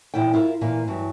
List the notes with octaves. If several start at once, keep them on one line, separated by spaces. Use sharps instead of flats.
A#2 E3 E4 F4 G5
E4 F4 A#4
A#2 E3 A#3
G2 E3 F#3